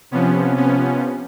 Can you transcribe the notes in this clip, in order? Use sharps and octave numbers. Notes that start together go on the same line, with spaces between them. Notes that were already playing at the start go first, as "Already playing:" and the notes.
C3 F3 B3 C#4
B3 C#4